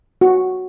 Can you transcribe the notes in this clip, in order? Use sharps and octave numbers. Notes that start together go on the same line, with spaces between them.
F#4